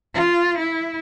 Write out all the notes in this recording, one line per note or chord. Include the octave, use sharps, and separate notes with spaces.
F4
E4